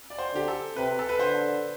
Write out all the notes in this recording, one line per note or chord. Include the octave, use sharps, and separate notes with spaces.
D5
C5
D3 G4
A4
C3 B4
A4
B4
D3 C5